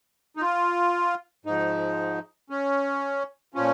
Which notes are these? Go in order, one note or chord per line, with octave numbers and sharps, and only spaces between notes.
D#4
F4
G#2 F3 D#4
C#4
A#2 F3 C#4